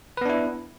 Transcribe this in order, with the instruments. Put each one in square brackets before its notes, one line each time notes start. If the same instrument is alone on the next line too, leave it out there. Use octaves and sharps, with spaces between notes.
[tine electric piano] B4
B3
D4
E4